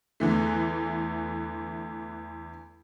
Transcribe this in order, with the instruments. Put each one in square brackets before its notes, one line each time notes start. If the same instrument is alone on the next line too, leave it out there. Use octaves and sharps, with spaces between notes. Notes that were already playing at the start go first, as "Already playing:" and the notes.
[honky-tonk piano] E2 D3 E3 A3